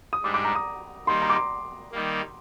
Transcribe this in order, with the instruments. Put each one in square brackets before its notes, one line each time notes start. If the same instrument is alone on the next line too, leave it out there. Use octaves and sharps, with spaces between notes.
[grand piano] D#6
[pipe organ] G#2 G3 D4 [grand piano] D6
[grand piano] D6
A#5
D#6
[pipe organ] D#3 G3 A#3 D#4 [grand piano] C6
[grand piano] A#5
D6
C6
[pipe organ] D#3 G3 A#3